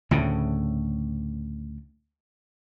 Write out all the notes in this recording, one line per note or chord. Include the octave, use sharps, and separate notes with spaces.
D2 A2 C#3